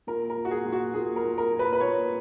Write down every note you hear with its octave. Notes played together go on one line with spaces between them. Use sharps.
A#2 A#4
A#4
A#2
F#4
G#4
A#2
F#4
A#2 G#4
A#4
A#2
A#4
A#2
B4
B4
A#2 C#5